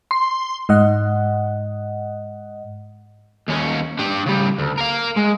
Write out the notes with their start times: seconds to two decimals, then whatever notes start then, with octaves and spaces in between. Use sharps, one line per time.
0.11 C6
0.69 G#2 D#5 F#5
3.48 D#2 C#4
3.99 D4 G4
4.26 C#3 G3
4.58 D2
4.78 A#4 F5
5.16 G#3